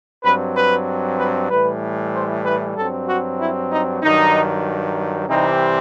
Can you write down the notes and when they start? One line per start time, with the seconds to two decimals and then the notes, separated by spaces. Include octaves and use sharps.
0.24 G2 F#3 C4 B4
0.56 B4
1.19 B4
1.50 A2 E3 G3 B4
2.13 C5
2.46 B4
2.77 G2 F#3 C4 A4
3.08 F#4
3.40 E4
3.72 D#4
4.03 G2 D#3 F#3 D#4
5.29 C2 C3 E3 G3 C4 D#4